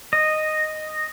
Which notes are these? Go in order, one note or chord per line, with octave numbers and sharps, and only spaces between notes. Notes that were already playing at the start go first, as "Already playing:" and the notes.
D#5